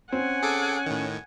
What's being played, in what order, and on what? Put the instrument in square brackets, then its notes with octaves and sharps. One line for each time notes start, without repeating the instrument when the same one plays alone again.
[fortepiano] C4 [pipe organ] C#4 [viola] F#5 G#5
[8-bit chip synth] G#4 A4 D6
A2 D#3